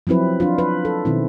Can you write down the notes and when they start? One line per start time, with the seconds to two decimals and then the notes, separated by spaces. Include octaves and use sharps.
0.07 F3 F#3 C4 E4 B4
0.40 D4 F4
0.58 B4
0.85 A4
1.05 B2 D#3 C4 E4